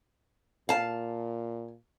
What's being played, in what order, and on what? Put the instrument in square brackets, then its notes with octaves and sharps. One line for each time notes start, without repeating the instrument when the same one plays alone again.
[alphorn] A#2 [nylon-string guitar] F5 A5